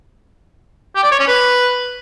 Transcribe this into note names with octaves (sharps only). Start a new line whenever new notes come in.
G4
D5
C#5
C#4
B4